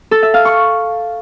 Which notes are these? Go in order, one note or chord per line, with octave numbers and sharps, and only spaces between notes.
A4
E5
F5
C#6